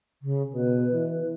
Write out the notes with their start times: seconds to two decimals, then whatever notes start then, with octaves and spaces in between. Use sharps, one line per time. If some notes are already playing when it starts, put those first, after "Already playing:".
0.22 C#3
0.54 B2 B4
0.93 E3